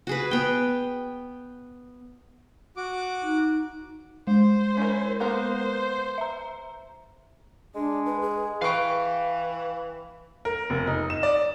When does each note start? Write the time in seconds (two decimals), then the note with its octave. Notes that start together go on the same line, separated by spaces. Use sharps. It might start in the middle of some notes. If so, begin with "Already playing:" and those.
0.07 F#4 G#4 B4
0.31 B3 G5
2.77 F#4 D6
3.23 D#4
4.27 G#3 C5
4.77 C#4 E4 A#4
5.20 A#3 B3 A#4 C5
6.18 E5 A#5
7.75 G#3 D4
8.05 B4
8.21 G#4
8.62 E3 B4 F5 G5 C#6
10.45 A#4
10.70 F1
10.87 D#4
11.10 E7
11.23 D5